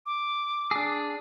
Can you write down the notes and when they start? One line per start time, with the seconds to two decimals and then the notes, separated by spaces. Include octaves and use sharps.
0.06 D6
0.71 D4 G#4